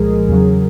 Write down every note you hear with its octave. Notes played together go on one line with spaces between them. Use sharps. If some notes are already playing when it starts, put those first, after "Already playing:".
Already playing: C2 A#2 F3 G#3 G#4 A#4
E2 C#3 F#3